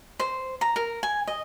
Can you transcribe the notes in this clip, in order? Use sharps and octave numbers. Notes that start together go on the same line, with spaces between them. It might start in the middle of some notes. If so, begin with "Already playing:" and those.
C5
A#5
A#4
G#5
D#5